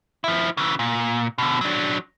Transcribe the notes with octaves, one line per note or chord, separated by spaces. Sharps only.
F3 E4
C#3 E3
A#2
B2 D3
F#3 D4